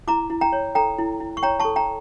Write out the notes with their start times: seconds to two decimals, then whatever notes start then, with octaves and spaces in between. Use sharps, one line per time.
0.07 E4 A#5 D6
0.30 E4
0.41 G5 A#5
0.52 C#5
0.75 A4 G5 A#5
0.99 E4
1.20 E4
1.37 C#6
1.43 C#5 G5 A#5
1.60 A5 C#6
1.65 A4
1.76 G5 A#5